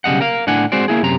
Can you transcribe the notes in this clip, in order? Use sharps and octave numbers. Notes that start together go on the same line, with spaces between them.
B1 C#3 G3 D#5 F#5
A#4 F5
A2 D4 F#5 G#5
G#3 C4 F#4 C5 D5
A#3 E4 G#4
F#2 C3 A#5